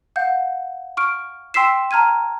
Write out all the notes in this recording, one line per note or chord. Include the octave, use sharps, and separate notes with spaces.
F5 F#5 G6
C#6 F6 D7
G5 C6 E6 B6 C7 E7
A5 A#5 F6 G#6 D#7